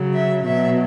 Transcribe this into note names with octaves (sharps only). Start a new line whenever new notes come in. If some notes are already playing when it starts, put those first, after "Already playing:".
Already playing: C#3 F#3
E5
B2 F#3 E5